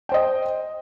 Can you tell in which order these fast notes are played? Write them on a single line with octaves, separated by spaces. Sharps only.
G5 C5 D#5